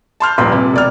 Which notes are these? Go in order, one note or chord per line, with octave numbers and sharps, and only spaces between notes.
A5 C6 F6 G6
D#1 A#1 B4 C6
C3
E1 D5 F6